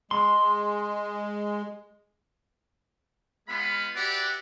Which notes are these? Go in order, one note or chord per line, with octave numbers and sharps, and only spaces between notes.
G#3 C6
G#3 B3 F4 F5 B5
F#4 G4 B4 D5 E5 F#5